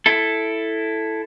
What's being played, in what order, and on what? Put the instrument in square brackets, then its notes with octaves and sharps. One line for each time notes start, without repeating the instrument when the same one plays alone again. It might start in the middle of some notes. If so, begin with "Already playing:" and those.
[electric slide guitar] E4 A4